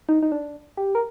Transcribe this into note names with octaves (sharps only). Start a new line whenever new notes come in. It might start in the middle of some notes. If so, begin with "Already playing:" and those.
D#4
D#4
D4
G4
A#4